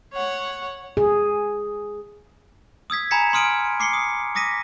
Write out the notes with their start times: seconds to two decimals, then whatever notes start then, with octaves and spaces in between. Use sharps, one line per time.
0.13 C#5 F#5
0.97 G#4
2.90 D#6 E6 G#6 B6
3.11 G#5 A#5 B5 G#6 B6 C#7
3.33 C6 D#6 F6 D7 D#7
3.80 D6 C7 C#7 G7
3.93 D#6
4.35 D6 D#6 A#6 B6 D#7